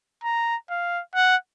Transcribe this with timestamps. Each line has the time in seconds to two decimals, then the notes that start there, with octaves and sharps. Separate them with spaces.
0.24 A#5
0.70 F5
1.15 F#5